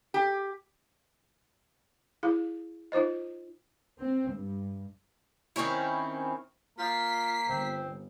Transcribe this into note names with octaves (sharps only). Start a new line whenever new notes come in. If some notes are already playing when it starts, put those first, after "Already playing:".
G4
E4 G#4 F5
D#4 F4 C5 D#5
C4
G2
D#3 C4 C#4 E4
A#3 F4 B6 C7
G1 C4